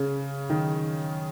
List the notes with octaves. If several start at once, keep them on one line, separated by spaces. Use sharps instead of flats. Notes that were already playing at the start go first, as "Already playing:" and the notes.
Already playing: C#3
D#3